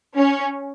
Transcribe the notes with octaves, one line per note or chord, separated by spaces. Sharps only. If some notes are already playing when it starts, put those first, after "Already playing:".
C#4